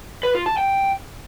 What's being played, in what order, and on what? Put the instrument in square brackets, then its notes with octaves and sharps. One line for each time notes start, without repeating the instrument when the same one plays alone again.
[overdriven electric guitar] B4
F4
A5
G5